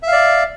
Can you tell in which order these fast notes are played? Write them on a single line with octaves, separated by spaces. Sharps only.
E5 F5 D5